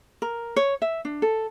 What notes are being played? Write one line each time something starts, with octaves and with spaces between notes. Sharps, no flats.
A#4
C#5
E5
D4
A4